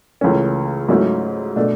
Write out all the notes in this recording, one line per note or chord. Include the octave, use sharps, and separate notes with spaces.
C#2 C#3 E3 A3 C#4
G#2 F#3 A3 C#4 E4
B2 A3 D4